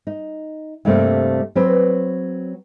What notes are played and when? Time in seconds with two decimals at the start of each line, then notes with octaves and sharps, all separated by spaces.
0.07 D#4
0.85 G2 C3 G3 A3 A#3 C4
1.55 F#3 C4 B4